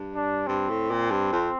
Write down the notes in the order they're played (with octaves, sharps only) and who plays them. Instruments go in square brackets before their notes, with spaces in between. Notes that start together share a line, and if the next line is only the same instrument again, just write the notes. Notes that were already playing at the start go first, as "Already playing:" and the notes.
Already playing: [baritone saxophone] G2
[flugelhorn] D4
[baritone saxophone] G2 [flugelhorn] C4
[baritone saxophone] A2
A#2
G2
F2